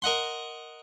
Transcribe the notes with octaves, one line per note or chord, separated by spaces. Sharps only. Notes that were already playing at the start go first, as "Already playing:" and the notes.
A#4 D#5 F#5 C6